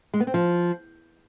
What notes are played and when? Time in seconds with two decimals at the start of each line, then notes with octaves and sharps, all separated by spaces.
0.14 G#3
0.20 B3
0.27 C4
0.34 F3